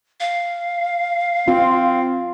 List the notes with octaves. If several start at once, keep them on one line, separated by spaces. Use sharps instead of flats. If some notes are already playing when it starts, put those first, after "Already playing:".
F5
C4 F4